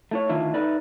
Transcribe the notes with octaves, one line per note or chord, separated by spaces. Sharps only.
A3 E4 C#5
D3 D#3 A3 E4 F4
D#4 A4 B4 D5 E5